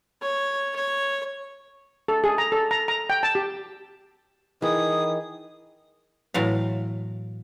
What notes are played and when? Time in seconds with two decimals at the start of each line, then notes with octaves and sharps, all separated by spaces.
0.22 C#5
0.76 C#5
2.08 A4
2.24 G#4
2.38 A#5
2.52 A4
2.71 A#5
2.88 A#5
3.10 G5
3.23 A5
3.35 G4
4.62 D#3 E3 G#4 D#6
6.34 A2 E3 F#3 F5